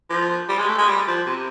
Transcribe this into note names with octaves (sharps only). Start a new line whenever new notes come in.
F3
G3
G#3
A3
G#3
G3
F3
C3